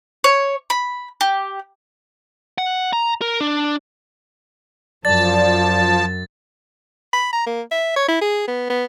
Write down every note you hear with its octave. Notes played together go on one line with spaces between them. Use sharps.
C#5
B5
G4
F#5
A#5
A#4
D4
F#2 F3 D5 A5 A6
B5
A#5
A#3
E5
C#5
E4
G#4
B3
B3